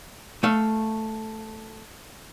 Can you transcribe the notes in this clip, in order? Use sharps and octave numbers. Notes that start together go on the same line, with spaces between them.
A3 E5 F5